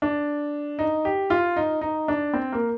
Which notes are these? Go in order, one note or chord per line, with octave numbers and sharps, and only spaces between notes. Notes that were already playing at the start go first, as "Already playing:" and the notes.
D4
D#4
G4
F4
D#4
D#4
D4
C4
A#3